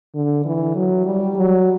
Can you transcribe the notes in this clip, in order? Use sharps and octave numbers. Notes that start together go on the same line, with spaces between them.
D3
E3
F#3
G3
F#3